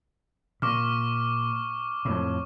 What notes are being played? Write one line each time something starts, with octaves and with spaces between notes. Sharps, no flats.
A#2 C#6 D6 F6
F2 A2